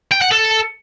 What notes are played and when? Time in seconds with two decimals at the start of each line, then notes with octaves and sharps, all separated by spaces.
0.11 G5
0.21 F#5
0.31 A4